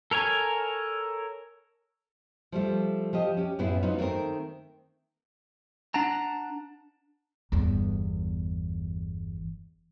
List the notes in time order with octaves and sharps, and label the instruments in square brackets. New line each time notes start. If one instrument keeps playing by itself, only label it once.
[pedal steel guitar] A4 A#4 C#5 G#5
[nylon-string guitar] F3 G3 A3
F3 G4 D#5
C#4 G4
F#2 A2 B3 E4 F4 G#4
G#2 F#3 B3 D#4 F4
D#3 A3 C4 A#4
[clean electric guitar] D4 F#5 A5 A#5
[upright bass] G1 E2